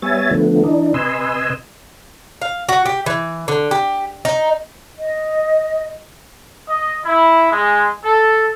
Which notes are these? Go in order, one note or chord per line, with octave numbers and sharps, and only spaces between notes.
G3 B3 C#5 E5 G#5 A6
D3 F3 A3 B3
E3 D4 D#4
C3 B4 D#5 G#5 C6 E6
F5
F#4
G4
E3
D3
G4
D#4
D#5
D#5
E4
G#3
A4